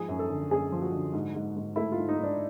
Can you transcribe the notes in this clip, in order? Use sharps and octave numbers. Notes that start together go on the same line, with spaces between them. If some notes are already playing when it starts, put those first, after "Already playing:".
Already playing: G#2 F3 G#4
F#2
A4
D3
F#2 G#4
F3
F#4
D3
G#2
G#2
G#2
A3 E4
F4
G#2
D#4
G#2
D4